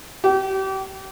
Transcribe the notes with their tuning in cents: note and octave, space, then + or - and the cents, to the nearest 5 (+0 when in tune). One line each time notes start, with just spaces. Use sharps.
G4 -30